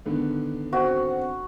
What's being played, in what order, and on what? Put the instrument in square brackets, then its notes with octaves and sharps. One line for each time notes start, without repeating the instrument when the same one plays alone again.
[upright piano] D3 D#3 B3
[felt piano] C4 [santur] F#4